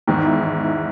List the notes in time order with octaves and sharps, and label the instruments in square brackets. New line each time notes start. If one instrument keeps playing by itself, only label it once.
[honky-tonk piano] E2 G#2 [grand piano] D#3
[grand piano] E4
D#3
E4